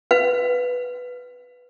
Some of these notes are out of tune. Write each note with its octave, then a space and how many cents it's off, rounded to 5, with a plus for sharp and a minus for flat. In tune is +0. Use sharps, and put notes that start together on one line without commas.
B4 +0 F5 +15